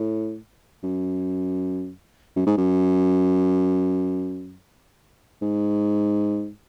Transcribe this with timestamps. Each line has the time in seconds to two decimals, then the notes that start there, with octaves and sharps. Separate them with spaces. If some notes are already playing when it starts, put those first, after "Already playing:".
Already playing: A2
0.83 F#2
2.36 F#2
2.47 G#2
2.57 F#2
5.42 G#2